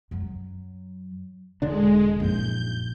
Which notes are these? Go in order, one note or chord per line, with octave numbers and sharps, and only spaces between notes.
F#2 F#3
E1 D3 G3 G#3 D4
A#1 F#2 D#4 G6